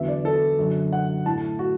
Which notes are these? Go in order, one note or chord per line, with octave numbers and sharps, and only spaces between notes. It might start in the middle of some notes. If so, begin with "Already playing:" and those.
Already playing: E2 D3 F#3 B3 E5
D5
A4
F#2 D3 F#3
F#5
A2 A3 A5
F#4